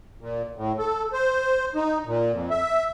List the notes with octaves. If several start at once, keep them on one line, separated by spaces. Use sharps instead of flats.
A#2
A2
A4
C5
D#4
A#2
F2
E5